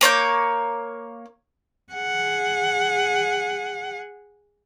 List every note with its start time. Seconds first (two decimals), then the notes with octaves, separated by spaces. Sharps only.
0.01 A#3 C#5 D6 G6
1.93 G#4 F#5